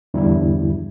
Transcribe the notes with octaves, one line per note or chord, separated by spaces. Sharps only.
E2 G2 D3 G3 E4